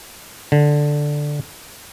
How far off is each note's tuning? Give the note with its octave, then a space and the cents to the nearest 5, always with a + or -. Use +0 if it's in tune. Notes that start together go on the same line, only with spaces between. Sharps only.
D3 +0